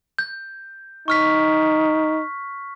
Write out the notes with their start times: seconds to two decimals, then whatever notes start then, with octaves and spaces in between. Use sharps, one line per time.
0.19 G6
1.08 D#4 C#6 F6 B6